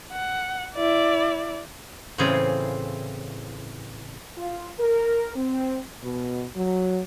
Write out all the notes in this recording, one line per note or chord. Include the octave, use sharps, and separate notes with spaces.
F#5
E4 D5
A2 C#3 E3 C4 F4 G#4
F4
A#4
C4
B2
F#3